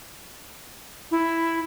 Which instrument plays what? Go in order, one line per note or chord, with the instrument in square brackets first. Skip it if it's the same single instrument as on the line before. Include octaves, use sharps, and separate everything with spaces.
[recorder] E4